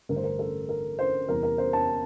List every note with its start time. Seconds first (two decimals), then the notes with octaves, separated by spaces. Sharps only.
0.09 A1 G2 D3 A#4
0.16 C5
0.23 A#4
0.39 A4
0.69 A#4
0.99 C5
1.28 E2 C3 E3 G3 A#4
1.43 A#4
1.58 C5
1.73 A5